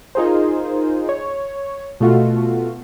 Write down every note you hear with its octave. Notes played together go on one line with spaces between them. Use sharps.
D#4 F4 G#4 A#4 C5
C#5
B2 A3 F4 F#4